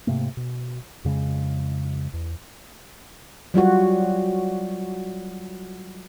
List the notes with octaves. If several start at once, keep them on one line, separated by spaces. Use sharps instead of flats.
G#2 C3 A3 A#3
B2
F2 C#3 G#3
E2
F#3 G3 F4 F#4